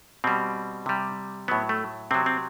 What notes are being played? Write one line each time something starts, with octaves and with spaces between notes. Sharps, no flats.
B2 G3 C4
C3 G3
A2 F#3 B3
A3
C3 F#3 C4
C4